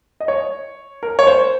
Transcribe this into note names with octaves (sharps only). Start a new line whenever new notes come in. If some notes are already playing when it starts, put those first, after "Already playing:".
D#5
C#5
A#4
C#5
C5